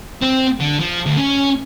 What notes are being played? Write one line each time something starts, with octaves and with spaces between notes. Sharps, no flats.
C4
D3
F3
D2
C#4